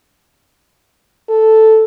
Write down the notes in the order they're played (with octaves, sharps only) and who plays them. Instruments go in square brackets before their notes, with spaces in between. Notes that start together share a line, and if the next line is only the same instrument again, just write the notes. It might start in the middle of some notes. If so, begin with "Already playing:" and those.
[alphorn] A4